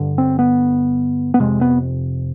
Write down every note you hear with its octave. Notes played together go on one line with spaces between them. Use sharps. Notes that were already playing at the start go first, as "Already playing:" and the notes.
Already playing: G2 D3
C4
B3
B3
F2 C3 G#3
B3